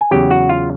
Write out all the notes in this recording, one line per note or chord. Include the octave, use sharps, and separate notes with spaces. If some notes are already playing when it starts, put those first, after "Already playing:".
G#5
E2 C#3 F#3 G4 G5
F#4 F#5
F4 F5